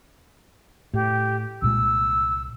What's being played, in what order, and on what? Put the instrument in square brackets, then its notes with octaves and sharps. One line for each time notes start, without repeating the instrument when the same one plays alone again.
[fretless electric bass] A2 [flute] G4
[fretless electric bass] C2 A#2 G#3 [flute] E6